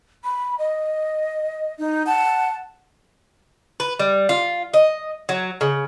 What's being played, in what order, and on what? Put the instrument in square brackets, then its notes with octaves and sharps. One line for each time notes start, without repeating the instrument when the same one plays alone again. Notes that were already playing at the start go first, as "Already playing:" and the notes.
[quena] B5
D#5
[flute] D#4
[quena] F#5 [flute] A5
[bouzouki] B4
G3
F4
D#5
F#3
C#3